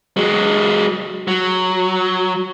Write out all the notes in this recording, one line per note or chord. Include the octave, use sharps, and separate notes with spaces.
F#3 G#3
F#3